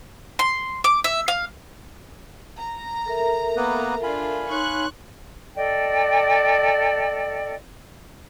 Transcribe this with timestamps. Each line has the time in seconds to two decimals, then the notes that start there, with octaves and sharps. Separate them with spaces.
0.39 C6
0.84 D6
1.04 E5
1.28 F5
2.59 A#5
3.06 A4 A#4 E5
3.57 A#3 B3 B4
4.03 D4 F4 F5 G#5 B5
4.50 D#4 C#5 C6 C#6 F#6
5.56 A4 D5 D#5 G5